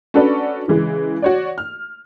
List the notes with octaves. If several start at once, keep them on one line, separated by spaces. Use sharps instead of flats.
C#4 D4 F#4 A4 B4 D5
C#3 E3 G#3
F#4 C#5 D5
F6